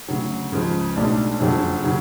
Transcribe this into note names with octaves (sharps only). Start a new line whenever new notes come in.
D2 C#3 F#3
C#2 C#3 F3 G#3
B1 A2 G#3 D4
F#1 F2 D3 F#3
C#3 F#3 C#4